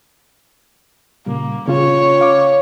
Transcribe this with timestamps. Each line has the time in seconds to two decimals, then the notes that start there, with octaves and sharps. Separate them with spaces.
1.26 A#2 C#3 G3 A#3
1.68 C#3 C#4 F4 C#5
2.21 F5 D6